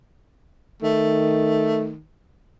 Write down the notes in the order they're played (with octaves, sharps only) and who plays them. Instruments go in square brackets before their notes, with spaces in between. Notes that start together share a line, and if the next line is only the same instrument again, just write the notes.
[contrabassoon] D#3 [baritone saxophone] A3